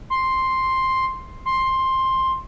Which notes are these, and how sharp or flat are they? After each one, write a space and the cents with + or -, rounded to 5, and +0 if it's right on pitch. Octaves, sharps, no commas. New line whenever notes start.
C6 +5
C6 +10